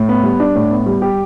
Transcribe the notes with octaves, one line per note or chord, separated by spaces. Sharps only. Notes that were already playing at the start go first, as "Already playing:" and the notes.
Already playing: A2
B3
G3
D4
A2
B3
G3
G4